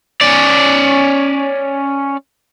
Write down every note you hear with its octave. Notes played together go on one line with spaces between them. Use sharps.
C#4 D5